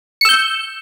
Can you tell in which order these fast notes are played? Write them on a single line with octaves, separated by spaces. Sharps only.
C#7 E6 G6